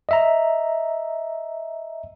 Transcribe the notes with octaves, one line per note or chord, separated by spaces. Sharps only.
D#5 E5 A#5